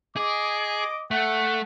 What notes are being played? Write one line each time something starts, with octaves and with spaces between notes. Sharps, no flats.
G#4 D#5 D6
A3 F#5